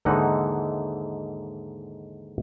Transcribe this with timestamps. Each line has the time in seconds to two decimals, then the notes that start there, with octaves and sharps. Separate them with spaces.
0.05 D#2 G#2 D3 E3 D#4 F#5